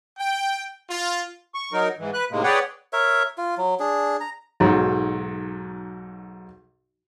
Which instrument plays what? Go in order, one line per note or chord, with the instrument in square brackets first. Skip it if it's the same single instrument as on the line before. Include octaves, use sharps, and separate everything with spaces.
[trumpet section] G5
F4
[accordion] C#6
F#3 D#4 A#4
G#2 E3
B4 F#6
A2 C3 D#3 G#3 A#3
G#4 B4 C#5 D5 F#5 G5
[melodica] A#4 C#5 E5
F4
F#3
D4 G#4
A#5
[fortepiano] B1 G#2 F#3